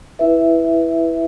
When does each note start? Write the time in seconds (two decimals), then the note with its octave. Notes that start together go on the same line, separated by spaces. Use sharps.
0.19 E4 B4 E5